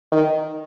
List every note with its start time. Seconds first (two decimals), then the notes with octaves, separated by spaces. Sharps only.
0.12 D#3